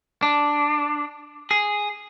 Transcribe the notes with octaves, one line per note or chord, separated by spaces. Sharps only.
D4
G#4